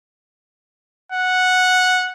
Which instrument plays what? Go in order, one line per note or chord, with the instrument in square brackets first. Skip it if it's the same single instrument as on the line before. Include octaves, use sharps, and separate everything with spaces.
[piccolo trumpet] F#5